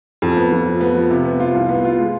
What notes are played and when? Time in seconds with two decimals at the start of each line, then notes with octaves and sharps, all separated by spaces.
0.22 F2
0.37 B3
0.52 F2
0.66 F3
0.81 B3
0.95 F3
1.10 C3
1.25 B3
1.40 F4
1.54 C2
1.69 B3
1.84 F4
1.98 G#3